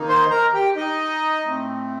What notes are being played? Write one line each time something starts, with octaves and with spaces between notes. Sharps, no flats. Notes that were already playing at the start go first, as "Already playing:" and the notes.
Already playing: D#3 A#3 D#4
C5 C6
A#4 A#5
G4 G5
D#4 D#5
A2 A3 C4